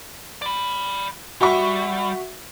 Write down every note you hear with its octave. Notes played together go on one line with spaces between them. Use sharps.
D5 B5
G3 F#4 E5 C#6